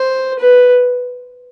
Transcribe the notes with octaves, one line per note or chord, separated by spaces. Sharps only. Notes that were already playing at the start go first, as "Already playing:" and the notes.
Already playing: C5
B4